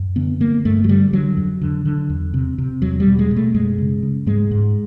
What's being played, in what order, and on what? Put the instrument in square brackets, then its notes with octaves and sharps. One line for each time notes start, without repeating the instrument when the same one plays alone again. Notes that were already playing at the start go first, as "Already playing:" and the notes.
Already playing: [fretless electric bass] F#2
D3 B3
D3 A#3
G2 A3
F#3
D3 G3
D3 F#3
F2
D3
D3
E2
C3
C3
E2 F#3
G3
B2
G#3
B2
A3
F#2 G#3
C#3
C#3
G#2 G#3
G#2